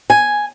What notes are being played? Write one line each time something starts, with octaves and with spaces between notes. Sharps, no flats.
G#5